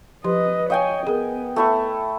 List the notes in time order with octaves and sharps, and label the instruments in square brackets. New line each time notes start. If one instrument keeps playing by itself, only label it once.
[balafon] F3 G4 C6 [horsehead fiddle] B4 D#5
[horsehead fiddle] C#5 [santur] D#5 G5 G#5 [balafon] F5
[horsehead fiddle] B3 [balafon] G#4 A#4
[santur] A3 E4 C#6